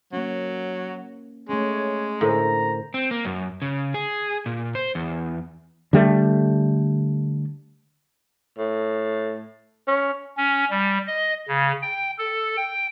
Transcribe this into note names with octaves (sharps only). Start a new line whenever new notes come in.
F#3 A#3 C#4
G#3 A3 C#4 C#5
A2 D3 A#4 C5 A#5
C4
A#3
F#2
C#3
G#4
A#2
C5
E2
D3 G3 A3
A2
C#4
C#4
G3
D#5
C#3
G5
A4
G5